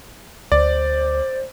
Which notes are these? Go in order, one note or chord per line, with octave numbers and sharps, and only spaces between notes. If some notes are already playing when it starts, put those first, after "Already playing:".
D2 C5 D5